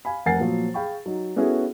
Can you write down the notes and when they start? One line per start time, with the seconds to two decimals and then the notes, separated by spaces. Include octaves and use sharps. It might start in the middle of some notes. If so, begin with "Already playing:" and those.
0.05 F5 G#5 B5
0.26 F1 A#4 F#5 G#5 A6 C7
0.40 A#2 F3 F#3
0.74 G#4 F5 G5 B5 C#6
1.06 F#3 D#4
1.36 B3 C#4 E4 F#4 G#4 A4